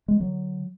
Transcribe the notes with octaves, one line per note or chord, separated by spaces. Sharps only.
G#3
D3 F#3